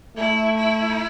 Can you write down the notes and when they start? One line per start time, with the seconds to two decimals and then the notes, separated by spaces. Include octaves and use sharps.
0.17 A3 E4
0.56 E4